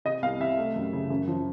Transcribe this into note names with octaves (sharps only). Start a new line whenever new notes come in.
C3 D#5
C2 F5
C3 E5
A3
F#2
C#3
F#2
F3